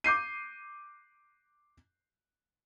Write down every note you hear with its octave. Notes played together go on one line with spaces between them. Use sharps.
D6 G6 C7 D#7